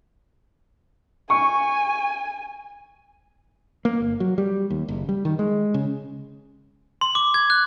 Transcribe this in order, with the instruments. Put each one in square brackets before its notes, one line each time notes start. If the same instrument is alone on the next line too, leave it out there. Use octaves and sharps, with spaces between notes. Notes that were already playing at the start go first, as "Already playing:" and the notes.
[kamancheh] G#5 [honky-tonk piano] C#6
[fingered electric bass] A#3
G1
F#3
G3
D#2
F#1
G3
D#3
G#3
C#3
[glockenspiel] C6
D6
G#6
F#6